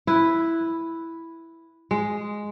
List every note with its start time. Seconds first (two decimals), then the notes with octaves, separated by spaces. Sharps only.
0.07 E4 B4
1.91 G#3